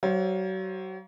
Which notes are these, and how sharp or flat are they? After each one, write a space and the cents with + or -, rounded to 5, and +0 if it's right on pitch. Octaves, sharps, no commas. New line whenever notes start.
F#3 +35 C5 +45 F5 +0